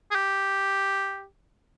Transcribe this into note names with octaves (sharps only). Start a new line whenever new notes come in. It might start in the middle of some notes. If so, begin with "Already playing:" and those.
G#4
G4